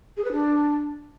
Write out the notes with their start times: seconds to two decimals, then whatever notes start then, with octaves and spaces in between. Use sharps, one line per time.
0.17 G#4
0.24 B4
0.32 D4